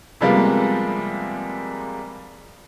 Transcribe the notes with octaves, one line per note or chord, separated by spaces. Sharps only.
C3 F3 G3 G#3 A#3 B3